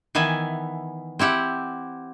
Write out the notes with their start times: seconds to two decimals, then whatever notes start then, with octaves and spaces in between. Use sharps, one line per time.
0.15 D#3 E3 B3 E5 G#5
1.19 C4 E4 G4 F#5